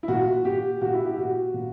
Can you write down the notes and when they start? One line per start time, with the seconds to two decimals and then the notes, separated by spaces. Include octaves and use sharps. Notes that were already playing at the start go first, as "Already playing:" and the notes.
0.03 E4
0.08 A#2 F#4
0.44 A#2 G4
0.81 A#2 F#4
0.94 E4
1.05 G4
1.18 A#2 F#4
1.54 A#2